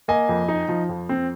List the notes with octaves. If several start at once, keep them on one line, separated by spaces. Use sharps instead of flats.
A#3 D#5 G#5
F2
D#4
F3
F2
C4